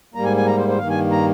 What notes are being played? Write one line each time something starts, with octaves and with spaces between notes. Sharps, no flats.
G#2 G3 A#3 A#5
G#5
G#5
A#5
C5
C5
G2 D#3 A#3 F5
G#5
A#5